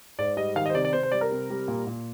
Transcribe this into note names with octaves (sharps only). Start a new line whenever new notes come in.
G#2 D5
G3 D#5
D#3 F5
D#5
C5
C3 D5
D5
C3 C5
C5
G3 D5
A#4
C3
G3
A#2
A#2